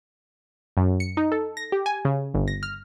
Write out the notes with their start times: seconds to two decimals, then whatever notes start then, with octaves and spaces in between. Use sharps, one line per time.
0.77 F#2
1.00 C#7
1.17 D#4
1.32 A4
1.57 A#6
1.72 G4
1.86 G#5
2.05 C#3
2.34 G1
2.48 A#6
2.63 F6